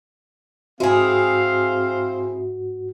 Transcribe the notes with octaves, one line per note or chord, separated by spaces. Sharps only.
G#2 C4 E4 F#4 G#4 F5